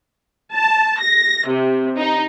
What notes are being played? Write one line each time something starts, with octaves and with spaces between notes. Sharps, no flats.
A5
A#6
C3
D#4